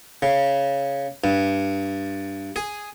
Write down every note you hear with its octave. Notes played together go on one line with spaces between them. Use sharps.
C#3
G2
G#4